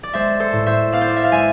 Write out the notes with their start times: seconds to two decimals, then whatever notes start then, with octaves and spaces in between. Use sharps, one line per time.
0.03 D5
0.13 G#3 C5 E5
0.40 A4 C5
0.53 A2
0.66 C5 E5
0.92 B3 D5 F5
1.01 C5
1.09 D5
1.16 E5
1.24 F5
1.32 G#3 E5 G#5